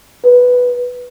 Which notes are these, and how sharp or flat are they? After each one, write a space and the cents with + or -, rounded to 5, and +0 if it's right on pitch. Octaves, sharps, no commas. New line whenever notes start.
B4 +0